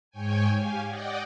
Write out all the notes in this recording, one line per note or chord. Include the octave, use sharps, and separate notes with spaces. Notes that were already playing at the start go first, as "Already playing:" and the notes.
G#2 C#5 G5 G#5
G4 F5 G#5
D5 D#5 F#5 G5